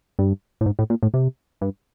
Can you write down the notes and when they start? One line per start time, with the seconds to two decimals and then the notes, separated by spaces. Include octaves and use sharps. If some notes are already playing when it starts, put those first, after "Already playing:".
0.19 G2
0.61 A2
0.66 G#2
0.79 A2
0.90 A#2
1.03 A2
1.14 C3
1.61 G2